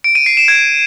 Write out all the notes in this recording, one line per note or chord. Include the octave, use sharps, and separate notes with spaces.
D7
D#7
C7
E7
G#6